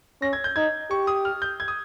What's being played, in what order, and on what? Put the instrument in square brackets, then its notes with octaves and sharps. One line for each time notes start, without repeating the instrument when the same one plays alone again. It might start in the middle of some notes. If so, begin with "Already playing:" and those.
[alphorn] C#4 [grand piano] A#6
[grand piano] G#6
G6
[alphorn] D#4 [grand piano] G#6
[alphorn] G4 [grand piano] C#6
[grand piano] D#6
F6
G6
G#6
D#6